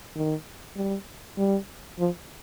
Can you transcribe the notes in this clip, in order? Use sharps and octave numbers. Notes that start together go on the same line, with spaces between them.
D#3
G3
G3
F3